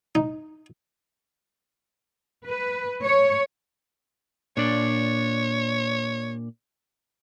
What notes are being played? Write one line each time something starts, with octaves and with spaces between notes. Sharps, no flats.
D#4
B4
C#5
A#2 D4 C#5 D5